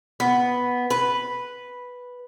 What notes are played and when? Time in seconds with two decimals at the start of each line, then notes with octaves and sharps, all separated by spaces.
0.20 B3
0.90 B4